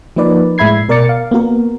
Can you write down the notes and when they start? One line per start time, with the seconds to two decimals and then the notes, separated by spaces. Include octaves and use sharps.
0.16 F3 A#3 D#4 B4 D5
0.58 A2 G#3 E5 B5 G#6 C7
0.89 B2 A#4 D5 D6 A6 C#7
1.09 F5
1.31 A#3 B3 F#4 A#4